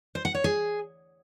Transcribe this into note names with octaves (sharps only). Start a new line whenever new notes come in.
C5
F#5
C#5
G#4